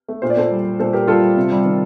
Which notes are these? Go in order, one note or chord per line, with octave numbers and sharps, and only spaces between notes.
A3
A#2 C5
D5
A#2 A4 C5
G3
G3
A#2 A4 C5
A#2 G4 A#4
G3 F4 A4
G3
C3
G3
D#3